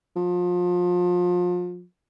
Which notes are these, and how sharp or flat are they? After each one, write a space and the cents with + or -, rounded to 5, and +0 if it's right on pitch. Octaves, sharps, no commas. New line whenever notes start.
F3 +30